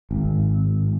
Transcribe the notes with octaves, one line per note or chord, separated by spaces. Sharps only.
G#1